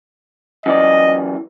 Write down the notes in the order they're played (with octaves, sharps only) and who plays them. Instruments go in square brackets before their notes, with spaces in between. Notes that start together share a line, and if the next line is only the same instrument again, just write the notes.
[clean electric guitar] F#2 E3 D5 [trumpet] D#5